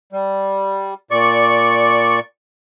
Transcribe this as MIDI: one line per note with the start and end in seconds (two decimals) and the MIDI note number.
0.13 0.94 55
1.11 2.20 46
1.11 2.20 74
1.11 2.20 85